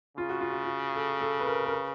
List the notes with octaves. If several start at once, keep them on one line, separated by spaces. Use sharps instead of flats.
C#3 F4
F#4
F4
F#4
F4
A4
A4
B4
A#4
A#4
B4